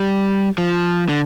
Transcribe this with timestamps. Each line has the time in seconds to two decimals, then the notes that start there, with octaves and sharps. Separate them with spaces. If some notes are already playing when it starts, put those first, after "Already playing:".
Already playing: G3
0.58 F3
1.09 D3